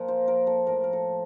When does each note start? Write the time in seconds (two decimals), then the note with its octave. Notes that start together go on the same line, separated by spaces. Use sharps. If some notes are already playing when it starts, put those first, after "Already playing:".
Already playing: A#2 F3 A#4
0.08 C5
0.28 A#4
0.47 A4
0.67 A2 F3 A#4
0.84 A#4
0.93 A4